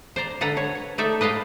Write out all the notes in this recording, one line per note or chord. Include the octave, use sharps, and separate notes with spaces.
C5 D5 A#5
D3 A4 B4 F#5 A#5
C#5
C#5
A3 D#4 A4 D5 E5
B4 D#5 F5 G5 A5